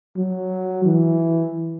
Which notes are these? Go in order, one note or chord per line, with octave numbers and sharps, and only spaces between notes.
F#3
E3